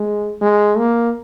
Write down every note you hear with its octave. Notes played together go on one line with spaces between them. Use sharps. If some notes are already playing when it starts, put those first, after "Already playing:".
Already playing: G#3
G#3
A#3